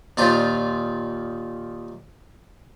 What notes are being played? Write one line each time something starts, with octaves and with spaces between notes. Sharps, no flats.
D#2 A#2 D#4 F4 C5 D5